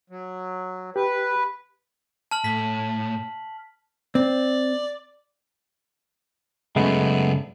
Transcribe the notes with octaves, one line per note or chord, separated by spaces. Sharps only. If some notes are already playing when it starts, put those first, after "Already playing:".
F#3
G4 B4
A5 F6 F#7
A2 B6
C4 D5
F#2 C#3 G#3 A3 B3